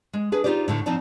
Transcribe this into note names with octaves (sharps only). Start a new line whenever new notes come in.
G#3
D4 G#4 B4
D#4 F4 G4 C5 D5
A2 D3 A3
F3 C4 D#4 D5 A5